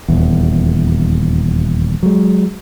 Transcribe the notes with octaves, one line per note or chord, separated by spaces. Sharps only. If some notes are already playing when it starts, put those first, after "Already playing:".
D#1 E2
F#3 G#3